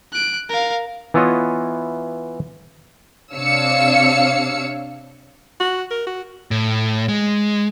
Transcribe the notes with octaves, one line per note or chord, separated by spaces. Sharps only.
F#6 D7
A#4 F5
E3 B3 E4 F4 C#5 D#5
C3 D4 C#5 F5 E6 C#7
F#4
A#4
F#4
A2
G#3